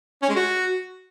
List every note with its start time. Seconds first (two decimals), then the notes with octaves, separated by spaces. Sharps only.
0.22 C#4
0.29 G#3
0.36 F#4